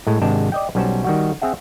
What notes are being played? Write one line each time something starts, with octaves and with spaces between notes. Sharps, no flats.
A2 G#3
G#1 C3 G#3 D4 G5 A5
D5 D#5 G5
B1 G3 C#4 F#4 C5 A5
D#3 G3 F#4
C4 G#4 E5 F#5